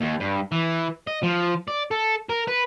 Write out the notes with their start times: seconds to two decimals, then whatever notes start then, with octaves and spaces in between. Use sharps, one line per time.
0.01 D#2
0.20 G2
0.52 E3
1.07 D#5
1.23 F3
1.68 D5
1.91 A4
2.29 A#4
2.48 B4